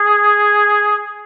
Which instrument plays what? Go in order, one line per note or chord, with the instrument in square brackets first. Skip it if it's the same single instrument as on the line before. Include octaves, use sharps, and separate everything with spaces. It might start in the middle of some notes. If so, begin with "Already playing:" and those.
Already playing: [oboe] G#4